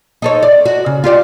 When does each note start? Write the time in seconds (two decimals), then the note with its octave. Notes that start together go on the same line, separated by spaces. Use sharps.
0.22 D#4 A4 C#5
0.43 D5
0.66 F#4
0.86 C#3
1.04 F4 G4 D5